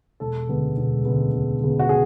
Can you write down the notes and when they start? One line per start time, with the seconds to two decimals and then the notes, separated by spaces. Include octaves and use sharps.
0.20 E1 A4
0.48 D2 C#3 G#3 B3
0.77 E1
1.05 D2 C#3 G#3 B3
1.33 E1
1.61 D2 C#3 G#3 B3
1.79 F#4
1.89 G#4